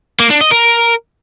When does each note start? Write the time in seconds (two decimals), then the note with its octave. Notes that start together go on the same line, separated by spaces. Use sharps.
0.20 A#3
0.30 D4
0.41 D#5
0.51 A#4